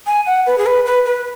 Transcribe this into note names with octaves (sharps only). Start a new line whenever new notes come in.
G#5
F#5
B4
G#4
B4
B4
B4